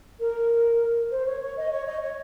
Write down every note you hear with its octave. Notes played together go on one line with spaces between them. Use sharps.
A#4
C5
C#5
C#5
D#5
C#5
D#5
C#5